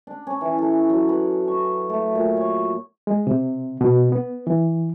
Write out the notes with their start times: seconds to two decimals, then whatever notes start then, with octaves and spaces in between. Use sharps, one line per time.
0.07 D4
0.27 C#4
0.41 E3
0.58 A4
0.90 F#3
1.09 B4
1.48 C#6
1.90 A3
2.15 A#2
2.37 C#5
3.07 G#3
3.27 C3
3.81 B2
4.12 B3
4.47 E3